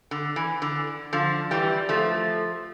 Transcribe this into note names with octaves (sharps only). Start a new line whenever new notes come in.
D3
E3
D3
D3 F3
E3 G3
F3 A3